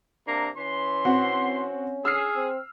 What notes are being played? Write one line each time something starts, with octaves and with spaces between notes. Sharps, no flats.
C3 A#3 D4 A#5
E3 C#4 C6
C4 F#4 F#5
G#4 E6 F6 C7
C4